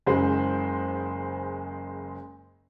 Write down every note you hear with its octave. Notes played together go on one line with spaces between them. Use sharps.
F#1 C#3 G#3 C5